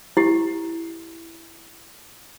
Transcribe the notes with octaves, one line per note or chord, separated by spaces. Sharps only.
E4 G4